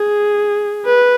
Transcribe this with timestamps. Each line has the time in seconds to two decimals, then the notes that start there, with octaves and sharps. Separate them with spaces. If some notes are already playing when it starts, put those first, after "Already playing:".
Already playing: G#4
0.86 B4